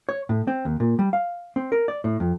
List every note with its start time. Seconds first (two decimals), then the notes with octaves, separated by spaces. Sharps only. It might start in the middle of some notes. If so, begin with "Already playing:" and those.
0.09 C#5
0.29 A2
0.47 C4
0.65 D#2
0.80 A#2
0.99 G3
1.13 F5
1.56 C4
1.72 A#4
1.88 D5
2.04 A2
2.20 F2